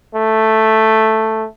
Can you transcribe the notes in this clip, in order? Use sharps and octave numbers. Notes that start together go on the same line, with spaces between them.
A3